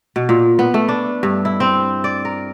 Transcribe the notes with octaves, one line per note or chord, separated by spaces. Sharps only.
B2
A#2
B3
A3
D4
G2
E4
C4
D5
A#4